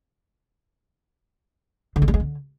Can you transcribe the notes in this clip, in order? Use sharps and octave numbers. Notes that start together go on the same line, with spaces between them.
D3
G#3
G3
G#3
D3